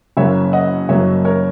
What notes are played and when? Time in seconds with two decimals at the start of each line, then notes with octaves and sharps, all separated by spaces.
0.17 F#1 F#2 C#3 F#3 A#3 C#5 E5
0.53 D#5 F#5
0.89 F#1 F#2 C#3 F#3 A#3 C#5 E5
1.25 A#4 C#5